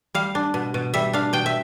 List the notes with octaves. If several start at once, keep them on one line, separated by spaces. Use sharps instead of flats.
G3 F5
D4
B2
B2
G3 E5
D4 F5
B2 G5
E5